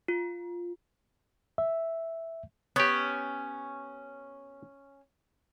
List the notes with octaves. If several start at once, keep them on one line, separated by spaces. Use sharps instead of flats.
F4
E5
B3 C#4 G4